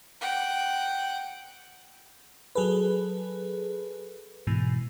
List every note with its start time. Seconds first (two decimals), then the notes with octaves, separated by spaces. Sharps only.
0.21 F#5 G5
2.55 F#3 G#4 A4 B4
4.47 G#2 B2 E3